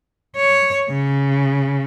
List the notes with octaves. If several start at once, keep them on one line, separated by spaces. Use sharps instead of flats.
C#5
C#3